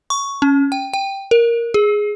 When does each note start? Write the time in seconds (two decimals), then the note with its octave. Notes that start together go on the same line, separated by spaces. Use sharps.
0.10 C#6
0.42 C#4
0.72 G5
0.94 G5
1.31 A#4
1.74 G#4